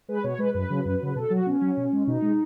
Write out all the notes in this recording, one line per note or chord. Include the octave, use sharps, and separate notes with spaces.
G#3 B4
B2 C#5
G#3 B4
F#2 B4
C#3 F#3
F#2
C#3 F#3
B2 A4
F#3 F#4
B2 C#4
F#3
B2
G#3
B2 D#4
G#3